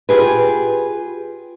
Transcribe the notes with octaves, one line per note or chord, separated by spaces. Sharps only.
F4 G4 G#4 B4